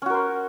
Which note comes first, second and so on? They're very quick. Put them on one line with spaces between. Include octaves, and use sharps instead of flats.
C#4 F#4 A#4 C5